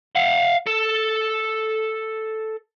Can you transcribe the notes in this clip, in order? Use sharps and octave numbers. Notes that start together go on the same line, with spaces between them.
F5 F#5
A4